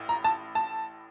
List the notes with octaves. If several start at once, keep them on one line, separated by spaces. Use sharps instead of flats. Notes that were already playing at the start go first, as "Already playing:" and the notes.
Already playing: A1 A2
A#5
A5
A5